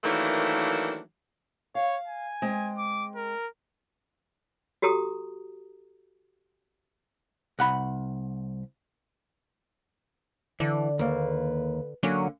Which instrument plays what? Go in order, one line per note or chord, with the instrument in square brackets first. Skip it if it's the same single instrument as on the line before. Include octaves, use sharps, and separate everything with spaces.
[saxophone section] D#3 E3 F#3 A3 A#3 D4
[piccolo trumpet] C#5 [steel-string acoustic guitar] F5
[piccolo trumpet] G#5
[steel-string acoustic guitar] G#3 C4
[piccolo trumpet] D6
A#4
[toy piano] F#4 G4 A4 A#5 D#6
[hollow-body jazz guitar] C2 F#5 B5
[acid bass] D3 [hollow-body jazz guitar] E3 [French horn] D5
[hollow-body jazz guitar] D#2 A#3 [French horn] B4
[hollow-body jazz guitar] D3 A#3 C#4 [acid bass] F#3